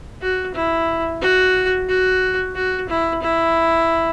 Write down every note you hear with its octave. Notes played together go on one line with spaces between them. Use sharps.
F#4
E4
F#4
F#4
F#4
E4
E4